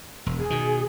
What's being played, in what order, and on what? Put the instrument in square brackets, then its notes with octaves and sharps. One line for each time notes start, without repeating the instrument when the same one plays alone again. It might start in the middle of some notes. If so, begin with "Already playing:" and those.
[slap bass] E1
[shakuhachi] G#4
[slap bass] B2 D#3